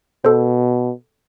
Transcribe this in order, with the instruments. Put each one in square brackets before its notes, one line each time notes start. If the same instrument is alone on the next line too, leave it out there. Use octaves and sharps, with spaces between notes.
[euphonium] B2 [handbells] A4 C5